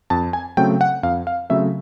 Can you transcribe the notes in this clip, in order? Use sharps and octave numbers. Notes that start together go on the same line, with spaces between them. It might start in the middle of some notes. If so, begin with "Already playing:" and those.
F2 A5
G#5
C#3 F#3 A3 C4 G5
F#5
F2 F5
F5
C#3 F#3 A3 C4 E5